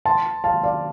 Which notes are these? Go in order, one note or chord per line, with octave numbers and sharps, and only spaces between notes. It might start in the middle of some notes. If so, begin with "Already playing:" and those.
A5 C6
F5 A5
D5 F5